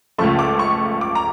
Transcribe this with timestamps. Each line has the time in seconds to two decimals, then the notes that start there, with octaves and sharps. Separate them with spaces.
0.18 C#2 C#3 F3 A3 C#6
0.39 D6
0.59 C#6
1.01 D6
1.15 A#5